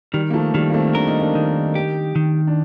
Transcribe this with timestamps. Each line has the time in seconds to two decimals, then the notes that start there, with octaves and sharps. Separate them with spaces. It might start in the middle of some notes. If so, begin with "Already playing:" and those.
0.13 D#3 G3
0.30 A#3
0.34 F3 A3
0.54 D#3 G3 A#3
0.70 A#3
0.74 A3 C4
0.95 D4 A#4
1.08 D#4
1.20 A#3 D4
1.35 D#3
1.75 G4
2.16 D#3
2.47 D4